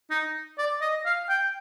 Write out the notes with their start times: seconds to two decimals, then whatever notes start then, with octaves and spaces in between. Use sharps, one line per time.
0.11 D#4
0.58 D5
0.81 D#5
1.06 F5
1.29 G5